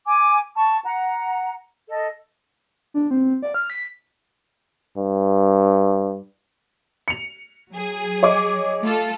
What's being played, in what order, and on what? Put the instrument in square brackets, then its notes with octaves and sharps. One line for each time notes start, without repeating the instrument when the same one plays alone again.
[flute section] G#5 D6
A5 C#6
F#5 A#5
A4 D#5
[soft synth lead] D4
C4
D5
F6
B6
[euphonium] G2
[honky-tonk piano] C#7 F7
[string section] F#3 G#4
[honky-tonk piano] C#5 D#5 D6
[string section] A3 F4 A4